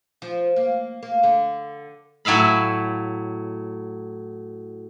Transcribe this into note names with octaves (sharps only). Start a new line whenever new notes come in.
F3
A#3
A#3
D3
A2 F#3 E5 F5 B5